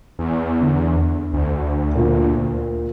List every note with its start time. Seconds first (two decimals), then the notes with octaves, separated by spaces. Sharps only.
0.19 E2
0.61 D3
1.33 D2
1.95 A#2